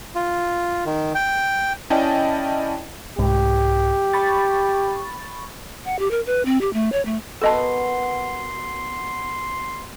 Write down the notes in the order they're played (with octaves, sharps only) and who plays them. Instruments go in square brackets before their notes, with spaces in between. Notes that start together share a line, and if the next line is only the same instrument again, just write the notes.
[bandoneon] F4
D#3
G5
[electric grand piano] C#4 E4 D5 D#5 G5 A5
[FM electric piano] C2 G#2 [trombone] G4
[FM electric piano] B5 C#6 A6
[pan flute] F#5
G4
A#4
B4
C4
G4
A3
C#5
A3
[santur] B3 F#4 A#4 [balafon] A4 D#5 A5 [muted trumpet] C6